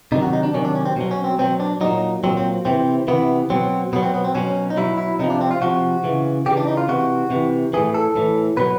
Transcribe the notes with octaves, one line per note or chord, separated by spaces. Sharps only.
C3 D#3 F#3 D#4
F#4
D#4
D4
C3 D#3 F#3 C#4
D4
C#4
C4
B2 F#3
C#4
C4
B2 F#3 C4
D4
A#2 F#3 D#4
A#2 F#3 C4
C4
C3 E3 C4
C3 E3 B3
B2 F#3 C4
B2 F#3 B3
C4
B3
C4
B2 F#3 C#4
D#4
B2 F#3 E4
E4
C3 F3 D#4
D4
C4
F4
C3 F3 F#4
C#3 E3
C#3 E3 G4
D4
D#4
F4
C3 E3 F#4
C3 E3
A2 E3 G#4
A4
A2 E3
B2 F#3 B4